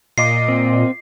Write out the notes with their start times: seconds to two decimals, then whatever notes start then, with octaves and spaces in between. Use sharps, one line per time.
0.18 A#2 F4 D#5 D6 C7
0.49 C4